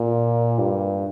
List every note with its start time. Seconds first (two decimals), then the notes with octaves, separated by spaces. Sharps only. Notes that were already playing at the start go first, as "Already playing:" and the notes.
Already playing: A#2
0.59 G2